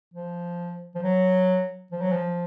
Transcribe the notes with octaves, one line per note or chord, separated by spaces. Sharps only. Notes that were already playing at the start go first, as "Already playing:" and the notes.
F3
F3
F#3
F3
F#3
F3